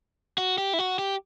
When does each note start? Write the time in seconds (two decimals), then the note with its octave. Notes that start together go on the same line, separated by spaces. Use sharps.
0.38 F#4
0.58 G4
0.73 E4
0.79 F#4
0.99 G4